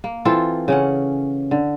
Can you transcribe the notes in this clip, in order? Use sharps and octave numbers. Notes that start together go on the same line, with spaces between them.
A#3
E3 C4 F4 A4
C#3 C#4 F#5
D3